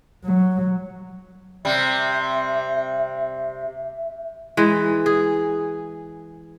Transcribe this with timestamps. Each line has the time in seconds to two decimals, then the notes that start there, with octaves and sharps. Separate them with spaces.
0.24 F#3
1.65 C3 G3 E5
4.57 E3 G#3
5.06 G#4